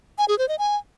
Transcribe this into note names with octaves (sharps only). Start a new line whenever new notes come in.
G#5
G#4
C5
D#5
G#5